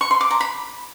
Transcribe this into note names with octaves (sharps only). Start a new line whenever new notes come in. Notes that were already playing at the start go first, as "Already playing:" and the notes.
C#6
C6
D6
A#5
B5